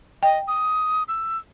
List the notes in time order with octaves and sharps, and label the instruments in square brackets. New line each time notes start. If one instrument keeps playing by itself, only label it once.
[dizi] D#5 [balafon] G5
[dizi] D#6
E6